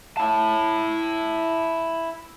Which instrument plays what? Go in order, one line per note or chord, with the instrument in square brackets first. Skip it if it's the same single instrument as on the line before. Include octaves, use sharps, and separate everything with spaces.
[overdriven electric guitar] E4 A5